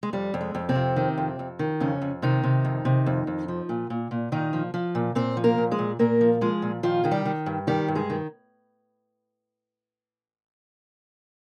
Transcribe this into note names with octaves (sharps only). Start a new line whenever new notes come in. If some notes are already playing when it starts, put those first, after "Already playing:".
G#3
F2 G3
F2
G#3
F2
C3 C4
F2
D#3
F2
F2
D#3
F2 C#3 C#4
F2
C3 D#3 D#4
C3
F2
C3
F2
F2
F3
A#2
A#2
A#2
A#2 D#3 D#4
F3
F3
A#2
A#2 C4 C5
F3
A#3 A#4
A#2
G#3 G#4
A#2
A#2 A#3 A#4
F3
F3 G#3 G#4
A#2
D#3 F3 F4
D#3 G#4
G3 G4
D#3
G2
D#3 G3 G4
G2
G#3 G#4
D#3